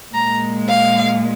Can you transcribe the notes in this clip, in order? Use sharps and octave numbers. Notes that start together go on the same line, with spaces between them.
A#2 G#3 A#5
F5